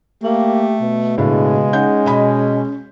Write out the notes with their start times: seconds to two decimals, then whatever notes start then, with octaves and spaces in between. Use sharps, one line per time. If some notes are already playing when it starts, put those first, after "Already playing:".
0.23 A3 A#3 G4
0.81 B2
1.18 A2 C#3 G#3 D4
1.73 C#4 D#4 F#5 G6
2.06 B2 D#5 B5